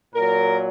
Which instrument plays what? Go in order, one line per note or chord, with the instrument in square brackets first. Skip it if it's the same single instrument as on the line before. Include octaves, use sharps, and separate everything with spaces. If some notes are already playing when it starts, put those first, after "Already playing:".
[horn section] A#2 F#3 A#4